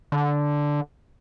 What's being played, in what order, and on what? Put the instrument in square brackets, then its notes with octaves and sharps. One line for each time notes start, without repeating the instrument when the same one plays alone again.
[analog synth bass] D3